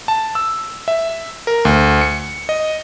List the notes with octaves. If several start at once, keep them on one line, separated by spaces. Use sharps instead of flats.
A5
E6
E5
A#4
D2
C#7
D#5